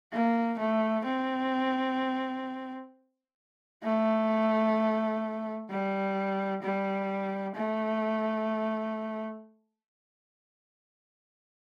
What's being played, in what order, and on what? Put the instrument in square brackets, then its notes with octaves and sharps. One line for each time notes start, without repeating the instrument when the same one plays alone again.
[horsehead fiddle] A#3
A3
C4
A3
G3
G3
A3